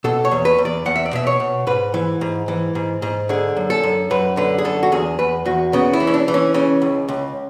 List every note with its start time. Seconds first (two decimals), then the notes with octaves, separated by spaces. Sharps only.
0.04 B2 A4
0.25 C#5
0.31 E2
0.45 B4
0.58 E2
0.65 D5
0.86 E2 F#5
0.96 E5
1.06 D5
1.13 B2 E5
1.27 C#5
1.40 B2
1.67 G#2 B4
1.94 E3
2.21 G#2
2.48 E3
2.75 G#2
3.02 G#2
3.29 D3 G#4
3.57 F#2
3.70 A4
3.83 F#2
4.11 F#2 B4
4.37 D3 B4
4.58 G#4
4.65 F#2 A4
4.83 F#4
4.92 E2 G#4
5.19 E2 B4
5.45 E2 F#4
5.73 C#3 B3
5.93 E4
6.00 E3
6.07 C#4
6.14 D4
6.28 E3
6.34 C#4
6.54 C#3 C#4
6.82 C#2
7.09 C#2